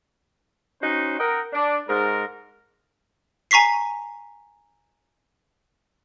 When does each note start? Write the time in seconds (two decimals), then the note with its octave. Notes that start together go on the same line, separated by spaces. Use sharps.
0.81 C#4 D#4 F#4 C5
1.18 A#4 D#5 F#5 G5
1.53 D4
1.88 G#2 A#4
3.51 G#5 A#5 C#6 B6 C7